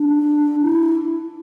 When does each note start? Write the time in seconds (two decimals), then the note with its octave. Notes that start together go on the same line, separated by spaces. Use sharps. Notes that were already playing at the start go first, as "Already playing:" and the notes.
Already playing: D4
0.63 E4